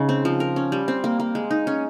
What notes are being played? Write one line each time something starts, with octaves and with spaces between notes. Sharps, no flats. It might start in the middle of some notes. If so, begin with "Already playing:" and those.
Already playing: C#3 G#3 D#4
C4
F3
A#4
C#4
G3
C4
A#3
A#3
G#3
D#4
C#4